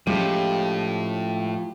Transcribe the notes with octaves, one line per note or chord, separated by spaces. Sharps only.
A2 F3 G#3 C#4 G4